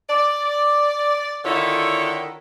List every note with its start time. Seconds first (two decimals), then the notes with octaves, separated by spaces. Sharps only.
0.10 D5
1.45 D3 D#3 E4 F4 A4 C#5